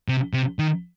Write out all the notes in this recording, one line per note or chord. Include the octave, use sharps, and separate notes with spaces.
C3
C3
D#3